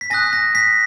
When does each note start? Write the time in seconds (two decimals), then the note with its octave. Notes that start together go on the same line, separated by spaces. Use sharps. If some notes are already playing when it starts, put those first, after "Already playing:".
0.01 B6
0.10 G#5 D#6 F#6 A#6
0.33 A#6
0.55 B6